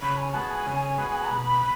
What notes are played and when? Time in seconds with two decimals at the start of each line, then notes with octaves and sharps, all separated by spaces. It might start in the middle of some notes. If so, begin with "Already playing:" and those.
0.02 C#3 B5
0.17 G#5
0.33 G#3 B3 F#4 A5
0.50 G#5
0.66 C#3
0.98 G#3 B3 F#4
1.30 B2 B5